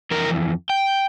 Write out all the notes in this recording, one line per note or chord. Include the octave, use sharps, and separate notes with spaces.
F2 E3 A#4
G5